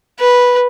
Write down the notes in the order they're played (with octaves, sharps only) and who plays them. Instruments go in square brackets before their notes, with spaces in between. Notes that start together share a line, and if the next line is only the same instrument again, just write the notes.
[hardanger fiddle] B4